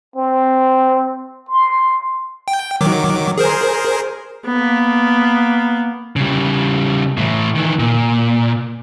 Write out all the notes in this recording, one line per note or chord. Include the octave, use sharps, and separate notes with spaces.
C4
C6
G5
D#3 F#3 D6
G#4 A#4 C5
A#3 B3
C#3 G3
A2 E3
D#3 E3
A#2